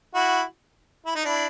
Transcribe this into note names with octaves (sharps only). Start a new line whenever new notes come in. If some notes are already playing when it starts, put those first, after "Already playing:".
E4 F#4
E4
D#4
D4 E4